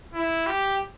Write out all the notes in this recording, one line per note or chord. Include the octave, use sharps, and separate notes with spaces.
E4
G4